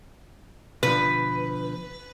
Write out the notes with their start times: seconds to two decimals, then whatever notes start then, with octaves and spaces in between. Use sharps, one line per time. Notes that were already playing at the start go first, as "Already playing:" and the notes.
0.83 B2 D3 F3 B4